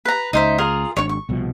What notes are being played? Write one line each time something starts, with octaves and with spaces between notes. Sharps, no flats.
B4 A#5
C#2 D#4 C5 E5
F4 G#4 A#4
G#1 D4 C#5 C#6
C#6
C2 B2 F3